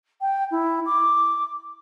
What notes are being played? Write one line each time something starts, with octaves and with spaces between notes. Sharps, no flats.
G5
E4
D6